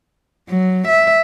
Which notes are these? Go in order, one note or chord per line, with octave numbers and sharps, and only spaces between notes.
F#3
E5